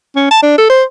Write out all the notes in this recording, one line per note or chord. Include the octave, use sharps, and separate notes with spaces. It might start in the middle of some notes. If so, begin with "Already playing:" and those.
C#4
A5
D4
A4
C5